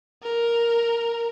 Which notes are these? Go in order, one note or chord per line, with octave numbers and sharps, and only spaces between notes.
A#4